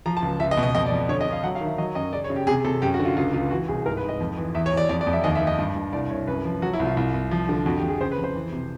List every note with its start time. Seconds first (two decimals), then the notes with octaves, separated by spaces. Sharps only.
0.06 F3 A#5
0.17 A5
0.23 C#2
0.40 C#2 E5
0.51 D#5
0.57 B2
0.63 D#5
0.75 F2 D#5
0.86 D5
0.92 F2
1.09 D3 C#5
1.21 D#5
1.26 D3
1.32 F5
1.44 F#3 F#5
1.55 F5
1.61 D#3
1.66 E5
1.78 F#3 D#5
1.95 F#2 D#5
2.13 C#3 D5
2.24 C#5
2.30 C#3
2.36 G4
2.47 C3 G#4
2.64 C3 A4
2.82 F#2 G4
2.94 F#4
3.00 D3
3.05 F4
3.17 C#2 F4
3.33 C#2 F4
3.51 E3 F#4
3.68 C2 G#4
3.86 G#2 A#4
3.97 B4
4.03 G#2
4.09 D#5
4.20 F2
4.37 E3
4.55 E2 E5
4.66 C#5
4.72 E2
4.77 D5
4.89 F2 D5
5.01 D5
5.07 F2
5.13 E5
5.24 D#2 D#5
5.35 E5
5.41 D#2
5.47 D#5
5.58 G2
5.76 G2
5.93 C2 D5
6.10 C2 C#5
6.28 F#2 B4
6.45 F3
6.62 F#3 F#4
6.73 E4
6.80 C2
6.86 F4
6.97 C2
7.14 C2
7.31 F3
7.49 D3
7.66 F2 F#4
7.78 G4
7.83 F2
7.88 G#4
8.01 C#3 C5
8.12 B4
8.18 F2
8.24 C5
8.35 E3
8.52 C3